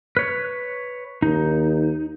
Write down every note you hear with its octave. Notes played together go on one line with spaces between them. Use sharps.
B4 C#5
D#2 D#4